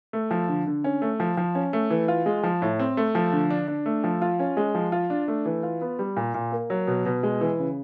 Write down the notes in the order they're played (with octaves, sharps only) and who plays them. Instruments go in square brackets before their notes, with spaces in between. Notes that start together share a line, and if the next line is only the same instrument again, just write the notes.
[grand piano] A3
F3
D3
D3
C#4
A3
F3
F3
C#4
A3
E3
F4
G#3
F3
A2
C4
A3
F3
D3
D4
D4
A3
F3
F4
C#4
G#3
F3
F4
D4
A3
E3
F4
B3
G3
A#2
A#2
A#3
F#3
B2
B2
G#3
E3
C#3